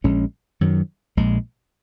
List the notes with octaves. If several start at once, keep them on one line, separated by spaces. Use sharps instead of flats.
A#1 A#2 G#3 C#4
F#2 D#3 F#3
A#1 A#2 G#3